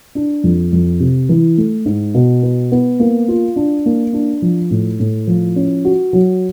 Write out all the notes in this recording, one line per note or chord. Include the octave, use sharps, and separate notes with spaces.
D4
F2
F2
C3
E3
A3
G#2
B2
B3
B3
A#3
F4
D4
A#3
D4
F3
A2
A2
F3
C#4
F#4
F#3